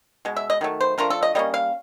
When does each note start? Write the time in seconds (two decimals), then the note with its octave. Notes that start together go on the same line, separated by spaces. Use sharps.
0.25 B2 G#3
0.36 E5
0.50 D#5
0.61 D#3 F#3 A3
0.81 C5
0.98 F3 A3 D4 F4 A#4
1.10 A4
1.23 D#5
1.35 G3 A#3 C#4 D#5
1.54 F5